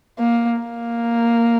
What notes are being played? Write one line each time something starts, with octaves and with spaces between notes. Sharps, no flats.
A#3
A#3